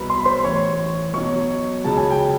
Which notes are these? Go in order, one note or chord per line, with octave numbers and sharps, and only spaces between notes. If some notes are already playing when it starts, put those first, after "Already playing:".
Already playing: C2 B2 F#3 B4 A#5 B5
C6
B5
C5 C6
A1 A2 E3 C#5 C#6
B1 B2 F#3 C#5 C#6
C#2 C#3 F#3 A5
G#5
G5